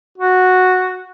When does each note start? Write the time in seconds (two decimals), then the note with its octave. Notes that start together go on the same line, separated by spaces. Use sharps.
0.18 F#4